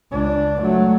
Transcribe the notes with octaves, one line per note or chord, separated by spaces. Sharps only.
C#2 D4
F#3 A3